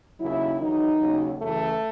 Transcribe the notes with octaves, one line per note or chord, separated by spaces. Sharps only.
D#2 C#3 F#3 E4
E2 D#3 F#3 D#4
D#2 C#3 F#3
F#2 C#3 E3 A3